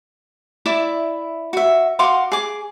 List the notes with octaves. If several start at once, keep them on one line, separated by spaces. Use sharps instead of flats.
E4 D5 E5 D6
F#4 E5
F#4 F5 C6 D6
G#4 D6